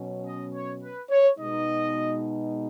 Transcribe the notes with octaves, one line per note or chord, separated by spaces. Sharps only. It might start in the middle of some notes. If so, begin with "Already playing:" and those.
Already playing: B2 F#3 C#4
D#5
C#5
B4
C#5
B2 G#3 D#4 D#5